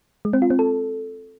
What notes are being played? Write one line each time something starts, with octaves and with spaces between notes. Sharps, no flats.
G#3
C4
F4
C4
A4